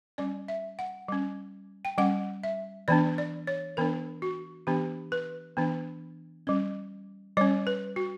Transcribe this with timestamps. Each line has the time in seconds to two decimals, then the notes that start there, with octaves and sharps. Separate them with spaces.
0.18 G3 C#4 D5
0.48 E5
0.79 F#5
1.08 G3 C#4
1.85 G5
1.98 G3 C#4 F#5
2.43 E5
2.88 E3 B3 D4 D5
3.18 D5
3.47 C#5
3.77 E3 B3 D4 A#4
4.22 F#4
4.67 E3 B3 D4 G4
5.12 B4
5.57 E3 B3 D4
6.47 G3 C#4
7.37 G3 C#4 C#5
7.67 B4
7.96 F#4